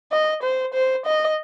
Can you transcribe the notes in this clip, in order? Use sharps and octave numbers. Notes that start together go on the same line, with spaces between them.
D#5
C5
C5
D#5